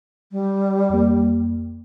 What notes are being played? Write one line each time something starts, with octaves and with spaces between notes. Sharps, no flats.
G3
F2 A#3